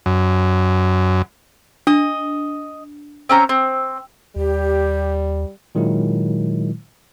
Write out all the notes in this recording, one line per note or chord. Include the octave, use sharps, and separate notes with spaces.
F#2
D4 D#5
C4 C#4 A#5
C4
D#2 G3 G4
A#2 D#3 F#3 G#3 E4